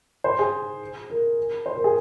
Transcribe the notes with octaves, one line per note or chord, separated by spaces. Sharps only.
C5
G#4
A#4
C5
A#4
G#4